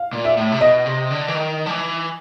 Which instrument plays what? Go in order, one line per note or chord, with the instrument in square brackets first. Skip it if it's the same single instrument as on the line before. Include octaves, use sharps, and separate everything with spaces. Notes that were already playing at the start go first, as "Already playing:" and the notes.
Already playing: [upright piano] F5
[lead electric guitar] A#2
[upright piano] E5
[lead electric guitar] A2
C3
[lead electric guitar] B2 [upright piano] D#5
[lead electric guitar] C3
D3
E3
D#3
F3
E3